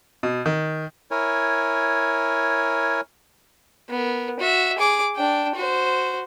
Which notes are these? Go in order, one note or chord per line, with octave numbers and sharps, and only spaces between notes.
B2
D#3
E4 A#4 C#5 G#5
B3 A#4
F#4 E5
G#4 D6
D4 G5
F#4 C5